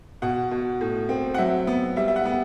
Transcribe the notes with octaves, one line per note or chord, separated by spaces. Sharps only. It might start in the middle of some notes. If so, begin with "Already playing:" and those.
B2 F#5
B2
A2
C4
F#5
F#3 E5
B3
G3 E5
E5
F#5
B3